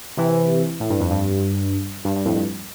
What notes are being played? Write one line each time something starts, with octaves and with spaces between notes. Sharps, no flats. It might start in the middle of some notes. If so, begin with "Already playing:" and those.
C3 E3
A2
G2
F2
G2
G2
G2
F2 A2
G2